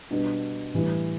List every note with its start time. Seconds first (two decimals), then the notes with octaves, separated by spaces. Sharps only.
0.11 B2 G3 D4
0.73 A2 E3 G3